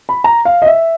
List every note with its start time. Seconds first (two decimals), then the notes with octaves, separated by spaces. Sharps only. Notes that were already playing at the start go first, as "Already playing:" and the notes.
0.09 B5
0.24 A#5
0.45 F5
0.62 D#5
0.66 E5